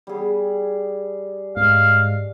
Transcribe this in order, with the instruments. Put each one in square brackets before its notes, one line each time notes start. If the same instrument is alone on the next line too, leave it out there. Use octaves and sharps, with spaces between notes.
[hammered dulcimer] G3 G#4
[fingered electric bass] G#2 [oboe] F5